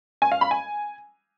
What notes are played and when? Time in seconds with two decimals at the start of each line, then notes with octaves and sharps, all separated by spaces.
0.22 G#5
0.32 F5
0.41 B5
0.51 G#5